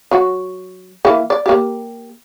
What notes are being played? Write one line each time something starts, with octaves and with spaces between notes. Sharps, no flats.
F#3 F#4
E3 A#3 E4
D5
A#3 G4